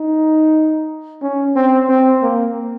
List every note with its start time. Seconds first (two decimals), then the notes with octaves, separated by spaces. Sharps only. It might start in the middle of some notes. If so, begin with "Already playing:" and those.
Already playing: D#4
1.22 C#4
1.56 C4
1.89 C4
2.23 A#3